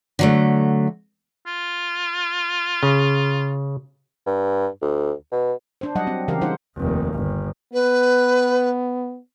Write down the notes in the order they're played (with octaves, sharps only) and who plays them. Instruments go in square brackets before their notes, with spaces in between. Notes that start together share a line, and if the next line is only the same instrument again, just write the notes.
[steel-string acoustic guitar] D3 F#3 A3
[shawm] F4
[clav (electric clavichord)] C#3
[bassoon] G2
D2
B2
[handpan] D4 C5
F#3 G3 D#5 F#5
C4
C#3 E3 G4 A#4 F5
G3 D#4 F4 C5 F#5
[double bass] F1 D#2
G1
[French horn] B3 [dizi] B4